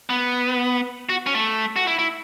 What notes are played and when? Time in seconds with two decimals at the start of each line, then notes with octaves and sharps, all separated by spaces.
0.09 B3
1.09 F#4
1.26 C#4
1.35 A3
1.76 F#4
1.87 E4
1.99 E4